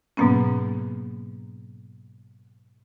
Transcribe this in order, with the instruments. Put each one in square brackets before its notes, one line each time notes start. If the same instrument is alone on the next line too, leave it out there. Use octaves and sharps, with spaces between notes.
[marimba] G#2 B2 F#3 A#3 B3 C#4